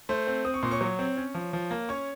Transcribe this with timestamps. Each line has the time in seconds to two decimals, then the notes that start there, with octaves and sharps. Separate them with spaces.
0.09 A3 C5 C6
0.27 C4
0.45 C4 D#6
0.54 C#6
0.63 A#2 C6
0.71 C#5 C#6
0.81 F#3
0.99 C4
1.17 C#4
1.35 F3
1.53 F3
1.71 A#3
1.89 C#4 C#5 C#6